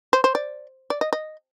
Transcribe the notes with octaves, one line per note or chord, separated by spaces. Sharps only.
C5
C5
D5
D5
D#5
D#5